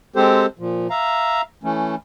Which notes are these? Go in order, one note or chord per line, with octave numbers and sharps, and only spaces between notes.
G#3 C4 G4 A4 C5
A#2 F3
E5 F5 A#5
E3 A3 C#4